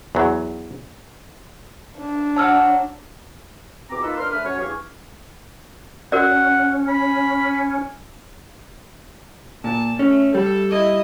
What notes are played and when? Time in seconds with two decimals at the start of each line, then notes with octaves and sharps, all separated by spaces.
0.15 E2 F#3
1.98 D4
2.36 C#5 F#5 A5 E6 F6
3.89 E2 B2 C4 A#5 D6
4.02 A#3 D#4 F4 A4 B4
4.17 D4 A#4 B4 C6 F6
4.31 A3 B4 F6
4.43 F#3 C#4 C#5
4.58 E2 G2 G4 F5 G#5 C#6
6.12 C#4 F#4 A#4 D5 F#5
6.88 G#5 B5
9.64 A#2 A5
9.99 A3 C#4
10.34 G3 A4
10.70 E4 D#5